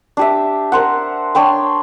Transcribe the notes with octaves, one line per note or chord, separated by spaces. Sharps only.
D4 G4 E5
A#4 C5 F#5
D4 C#5 G5 C6